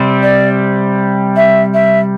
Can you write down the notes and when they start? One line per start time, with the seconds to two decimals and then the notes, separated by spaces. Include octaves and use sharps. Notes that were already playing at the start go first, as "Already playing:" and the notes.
Already playing: C3 G3 C4
0.23 D5
1.36 E5
1.74 E5